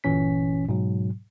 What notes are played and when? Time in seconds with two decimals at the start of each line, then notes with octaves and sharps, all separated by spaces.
0.04 G1 A#2 E3 C#4 B6
0.69 G#2 B2 F#3